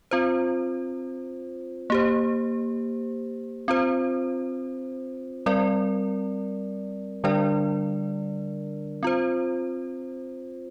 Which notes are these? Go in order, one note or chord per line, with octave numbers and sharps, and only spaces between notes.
C4 F4 C5
A#3 G4 C5
C4 F4 C5
G3 C4 A#4 D5
D3 G3 D4 A#4 D5
C4 F4 C5